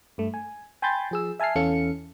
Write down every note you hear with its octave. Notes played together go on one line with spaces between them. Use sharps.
G2 A3
G#5
G5 G#5 B5 C6 G6 A6
F3 G#4 E6
E5 G#5 A5 F6 C7
E2 E3 C#4 A4 F5 C#7